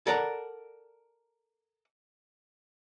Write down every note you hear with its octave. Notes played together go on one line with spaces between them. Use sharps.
A4 A#4 D5 F#5 A5 A#5